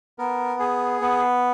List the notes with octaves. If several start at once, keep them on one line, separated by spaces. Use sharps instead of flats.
B3 A#4
G#4
B3